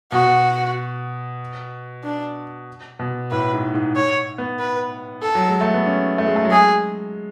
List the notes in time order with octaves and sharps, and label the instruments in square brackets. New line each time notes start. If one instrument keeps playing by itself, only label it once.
[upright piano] B2 [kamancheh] F#4
[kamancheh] D4
[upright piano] B2
[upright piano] A2 [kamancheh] B4
[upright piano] G#2
G#2
[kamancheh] C#5
[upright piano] B3
[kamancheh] B4
A4
[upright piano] F#3
G#3
A3
B3
C#4
A3
G#3
A3
F#3
[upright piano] G#3 [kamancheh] G#4